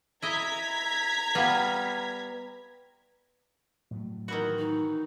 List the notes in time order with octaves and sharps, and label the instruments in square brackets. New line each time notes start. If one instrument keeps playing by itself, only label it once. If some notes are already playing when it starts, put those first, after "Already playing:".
[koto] E4 D#5 [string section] A#5 G#6 B6
[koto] G3 B3 F4
[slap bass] A2 F#3 A3
[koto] D#3 E3 F#4
[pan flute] D#4